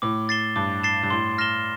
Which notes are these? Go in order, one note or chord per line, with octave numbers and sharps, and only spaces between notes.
A2 D6
A6 C7 E7 G7
G2 D6
A6 C7 E7 G7
G2
A2 C6
F6 A#6 E7 G7